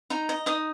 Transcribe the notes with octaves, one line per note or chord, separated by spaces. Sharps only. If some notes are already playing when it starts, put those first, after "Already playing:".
D#4 A#5
D#5
D#4 D#6